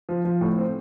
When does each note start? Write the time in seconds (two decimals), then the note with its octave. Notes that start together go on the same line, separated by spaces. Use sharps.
0.09 F3
0.25 F3
0.41 A2
0.58 C4